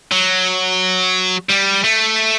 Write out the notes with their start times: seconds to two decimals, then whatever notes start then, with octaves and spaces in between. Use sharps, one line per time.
0.12 F#3
1.50 G3
1.84 A3